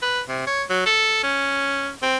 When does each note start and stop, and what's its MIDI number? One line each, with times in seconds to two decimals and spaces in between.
0.02 0.21 71
0.29 0.42 48
0.47 0.63 73
0.70 0.84 54
0.86 1.20 69
1.23 1.90 61
2.02 2.17 60